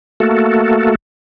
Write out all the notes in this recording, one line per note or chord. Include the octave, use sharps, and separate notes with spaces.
A3 A#3 F#4 A4